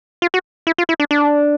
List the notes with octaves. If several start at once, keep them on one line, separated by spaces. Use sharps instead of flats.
F4
F#4
E4
F4
E4
D4
D4